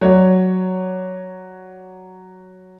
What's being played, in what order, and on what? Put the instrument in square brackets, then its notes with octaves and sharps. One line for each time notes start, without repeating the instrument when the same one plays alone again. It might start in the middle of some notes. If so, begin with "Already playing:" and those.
[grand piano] F#3 C#5 D5